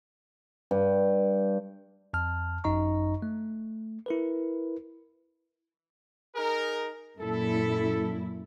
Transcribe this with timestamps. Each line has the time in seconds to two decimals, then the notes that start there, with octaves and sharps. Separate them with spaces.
0.71 G2
2.13 F2 A5 F6
2.64 G#1 F#2 D#4 D#5 A#5 C#6
3.22 A3
4.06 E4 A#4 B4
6.36 D#4 G#4 A#4
7.20 F#2 A#2 E4 A4